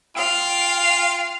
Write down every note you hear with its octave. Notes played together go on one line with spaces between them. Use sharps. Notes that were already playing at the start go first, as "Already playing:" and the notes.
F4 F5 G5